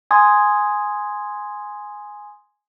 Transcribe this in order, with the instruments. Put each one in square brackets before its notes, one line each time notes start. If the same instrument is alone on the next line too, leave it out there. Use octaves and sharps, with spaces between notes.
[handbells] G#5 C6 D#6 G#6